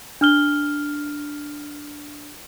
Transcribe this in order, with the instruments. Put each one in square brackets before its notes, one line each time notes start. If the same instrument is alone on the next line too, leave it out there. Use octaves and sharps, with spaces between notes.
[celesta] D4 F6 G7